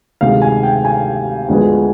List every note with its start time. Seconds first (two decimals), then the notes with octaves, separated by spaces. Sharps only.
0.21 D2 C3 D#3 G#3 F5
0.42 G#5
0.63 G5
0.85 G#5
1.48 D2 D3 F3 G#3 B3